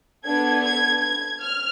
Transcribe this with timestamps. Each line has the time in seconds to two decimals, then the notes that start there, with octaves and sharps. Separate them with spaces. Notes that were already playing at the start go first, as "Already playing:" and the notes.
0.25 B3 D4 A4 G#6
0.64 G#6
1.03 G#6
1.42 F6